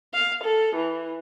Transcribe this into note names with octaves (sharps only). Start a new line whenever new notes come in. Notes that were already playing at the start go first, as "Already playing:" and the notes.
F5
A4
E3